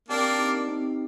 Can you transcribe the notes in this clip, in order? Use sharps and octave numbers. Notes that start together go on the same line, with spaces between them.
A#3 C4 D4 G4 D5 G5
C4 D#4 G4
C4 D#4 G4